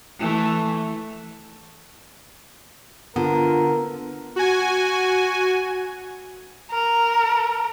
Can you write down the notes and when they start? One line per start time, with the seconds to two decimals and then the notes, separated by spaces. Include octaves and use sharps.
0.19 E3 A3
3.16 D3 B3 F4 A#4
4.36 F#4 G#5
6.71 A#4